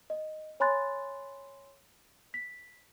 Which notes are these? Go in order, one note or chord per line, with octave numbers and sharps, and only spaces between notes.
D#5
C#5 G#5 B5 C6 F#6 A6
B6